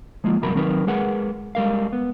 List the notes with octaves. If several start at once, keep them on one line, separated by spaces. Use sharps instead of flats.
F3 G#3 A#3 F4
E2 G2 C3 F#3 A#4 B5
D#3 F#3 C4 D#4 A#4 B4
G#3 G#4 A#4 B4 F#5
G3 G#3 A#4 F5
B3